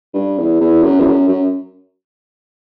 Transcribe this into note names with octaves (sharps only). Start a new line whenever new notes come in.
G2
E2
E2
F#2
E2
F#2
F#2